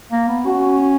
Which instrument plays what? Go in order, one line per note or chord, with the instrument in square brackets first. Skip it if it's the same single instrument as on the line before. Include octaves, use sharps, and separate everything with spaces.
[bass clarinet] A#3
B3
[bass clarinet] C#4 [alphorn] F#4